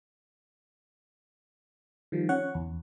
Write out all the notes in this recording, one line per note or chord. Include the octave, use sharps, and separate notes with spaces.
D#3 F3 G3
C#4 C#5 F#5
E2